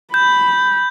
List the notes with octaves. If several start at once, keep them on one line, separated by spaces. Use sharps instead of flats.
B5 G6